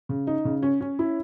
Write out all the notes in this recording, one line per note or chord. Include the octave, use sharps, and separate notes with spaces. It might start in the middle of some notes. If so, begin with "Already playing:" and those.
C#3
D#4
C#3
C#4
C#4
E4